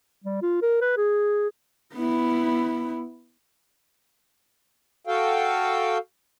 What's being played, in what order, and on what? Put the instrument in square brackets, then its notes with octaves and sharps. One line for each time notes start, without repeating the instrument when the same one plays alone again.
[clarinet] G3
F4
A#4
B4
G#4
[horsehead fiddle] B3 E4
[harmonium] F#4 A4 F5 G5